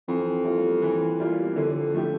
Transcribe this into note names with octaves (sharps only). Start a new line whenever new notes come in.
F2 E3
G3 A#3 F4
E3
G3 A#3 F4
F2 D3
F3 A3 E4 G4